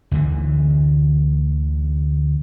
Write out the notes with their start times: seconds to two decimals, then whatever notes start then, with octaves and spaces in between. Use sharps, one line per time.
0.11 D2 D3 E3